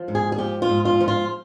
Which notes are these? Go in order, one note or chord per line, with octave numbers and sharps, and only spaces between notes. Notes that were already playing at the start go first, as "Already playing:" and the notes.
Already playing: F3
G#2
G#4
G#4
F3 G4
F4
G#2
F4
F3
F4